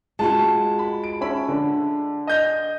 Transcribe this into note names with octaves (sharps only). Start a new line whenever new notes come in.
G#3 F4 F#4 A5
B5
D7
C#4 E5 B5
D3
D#5 G6